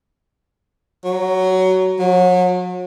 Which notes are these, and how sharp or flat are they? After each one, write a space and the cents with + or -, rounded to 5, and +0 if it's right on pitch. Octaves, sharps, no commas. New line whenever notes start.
F#3 +15
F#3 -35